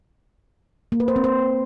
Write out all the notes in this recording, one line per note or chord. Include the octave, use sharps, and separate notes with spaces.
A#3
B4
C5
C4
C5